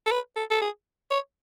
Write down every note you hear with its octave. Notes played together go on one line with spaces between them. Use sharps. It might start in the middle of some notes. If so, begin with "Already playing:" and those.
A4
B4
A4
A4
G#4
C#5